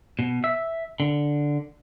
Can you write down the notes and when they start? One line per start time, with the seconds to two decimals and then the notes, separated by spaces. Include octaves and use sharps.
0.19 B2
0.44 E5
1.00 D3